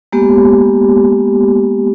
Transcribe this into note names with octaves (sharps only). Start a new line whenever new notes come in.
G#3 A#3 B3 G4